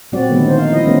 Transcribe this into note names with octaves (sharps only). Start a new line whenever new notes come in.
A#2 F#3 C4 F#4 D5
D3 D#3 F3 G#3 A3 B3
D#3 C5
D#4 F5
F3 E4 D#5
D#3 G#3 A3 B3 C#4